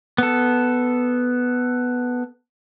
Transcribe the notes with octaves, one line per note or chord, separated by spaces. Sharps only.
B3 A4